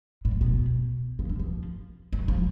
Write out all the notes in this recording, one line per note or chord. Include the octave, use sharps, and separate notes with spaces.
A2
B2
C#3
D3
F3
F#3
F3